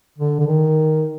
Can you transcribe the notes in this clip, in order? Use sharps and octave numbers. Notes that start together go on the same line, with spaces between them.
D3
D3
D#3